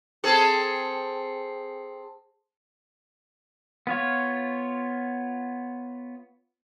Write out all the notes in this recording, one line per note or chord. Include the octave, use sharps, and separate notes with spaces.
C4 G#4 A4
B3 F4 C#5